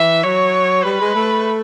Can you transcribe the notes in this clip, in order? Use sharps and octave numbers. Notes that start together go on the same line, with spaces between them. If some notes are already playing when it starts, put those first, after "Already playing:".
Already playing: E3 E5
F#3 C#5
G3 B4
G#3
A3